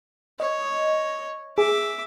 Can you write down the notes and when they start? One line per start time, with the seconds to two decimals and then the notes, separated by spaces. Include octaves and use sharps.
0.40 C#5 D#5
1.58 G#4 E5 D6